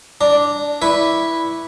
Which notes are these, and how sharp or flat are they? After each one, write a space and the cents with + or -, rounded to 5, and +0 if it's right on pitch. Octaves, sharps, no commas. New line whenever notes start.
D4 -5 A#5 -25
E4 +0 B4 -5 C#6 +0